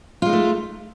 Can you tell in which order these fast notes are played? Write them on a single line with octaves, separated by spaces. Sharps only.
F4 G#3 D#4 A3